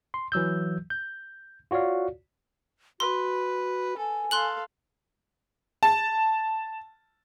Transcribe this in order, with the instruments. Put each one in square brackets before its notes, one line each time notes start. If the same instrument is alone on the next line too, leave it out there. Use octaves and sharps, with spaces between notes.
[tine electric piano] C6
E3 F#3 E6 G6
G6
F4 F#4 C#5 D5 F5
[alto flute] F#4 [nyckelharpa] B4 [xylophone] C6
[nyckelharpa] A4 [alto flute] G#5
[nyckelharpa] A4 F5 [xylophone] C6 F#6 F#7
[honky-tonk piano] A5